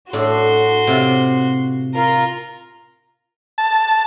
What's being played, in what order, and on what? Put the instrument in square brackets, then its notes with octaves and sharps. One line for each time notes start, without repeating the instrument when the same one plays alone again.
[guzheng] A2 D4 [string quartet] F#4 C6
[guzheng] C3 F4
[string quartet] F4 A#4
[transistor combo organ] A5